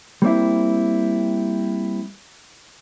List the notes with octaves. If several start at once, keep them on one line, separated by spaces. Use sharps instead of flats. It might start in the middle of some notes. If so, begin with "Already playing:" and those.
G3 A#3 C4 E4